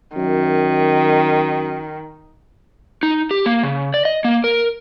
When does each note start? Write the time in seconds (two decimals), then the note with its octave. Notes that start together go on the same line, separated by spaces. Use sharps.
0.16 F#2 D#3
3.03 D#4
3.31 G4
3.46 A#3
3.63 C#3
3.94 D5
4.05 D#5
4.24 A#3
4.44 A#4